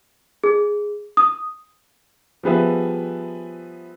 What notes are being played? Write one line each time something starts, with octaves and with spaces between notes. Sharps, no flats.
G#4
D#6
F3 G3 B3 G#4 B4 E5